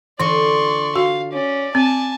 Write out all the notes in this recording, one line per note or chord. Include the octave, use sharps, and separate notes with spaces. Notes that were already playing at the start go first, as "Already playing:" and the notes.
D3 E3 F4 D5 C6 C#6
F#4 F5
C#4 D5
C4 G#5 A5